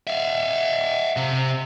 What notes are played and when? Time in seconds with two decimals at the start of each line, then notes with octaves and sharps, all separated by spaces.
0.07 E5 F5
1.17 C3